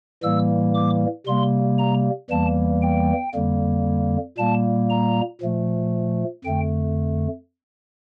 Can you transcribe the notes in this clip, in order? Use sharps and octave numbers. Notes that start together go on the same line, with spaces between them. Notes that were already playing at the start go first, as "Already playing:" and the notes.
A2 E3 G3 A#3 E6
D6
C3 G3 A#3 C6
A#5
E2 E3 G3 A#3 A5
G5
F2 D3 G3 A#3
A#2 G3 A#3 A5
A#5
A#2 F3 A3
F2 D3 A3 G5